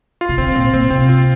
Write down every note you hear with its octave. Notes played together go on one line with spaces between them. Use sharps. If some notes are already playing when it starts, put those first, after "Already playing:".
F4
C3
D3 C4
A#2 C4
A#2 C4
C3 C4
F4